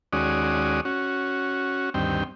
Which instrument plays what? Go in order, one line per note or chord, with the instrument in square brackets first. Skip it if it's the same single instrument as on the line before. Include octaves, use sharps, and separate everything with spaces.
[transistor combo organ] D#2 G#3 C#4 F#4 D5 D#6
C#4 F#4
D2 G2 D#3 C4 G5